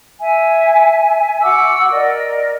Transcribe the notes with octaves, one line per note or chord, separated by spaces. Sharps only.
E5 G#5
F#4 F#5 D6 E6
A#4 D5 D#5